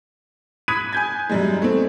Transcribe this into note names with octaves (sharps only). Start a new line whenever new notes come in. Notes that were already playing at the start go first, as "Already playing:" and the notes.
B5 D#6 F#6 G#6 B6 D#7
G#5 G6 G#6
F#2 G3 G#3
A3 C4